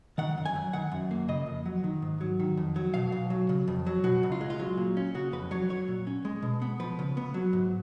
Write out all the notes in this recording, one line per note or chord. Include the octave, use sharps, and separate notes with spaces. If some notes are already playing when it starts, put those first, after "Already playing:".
D#3 F#5
F#2
G#5
F#3
D#3 F#5
F#2
A#3
C#3 D#5
F2
F#3
D#3
G#2
F#3
D#3
F2
F#3
B2 F5
B1
F#3
C#3
F2
F#3
B2 F#4
C#2
F4
G#3
F4
F#3
A#2
C#4
C#3 F#4
F2 B4
F#3 C#5
F#3 C#5
A#2
C#4
G#3
B2
B3
F3 B4
C#3
B3
F#3
G#2